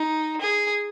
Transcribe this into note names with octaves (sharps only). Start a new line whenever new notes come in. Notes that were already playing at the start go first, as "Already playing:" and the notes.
Already playing: D#4
G#4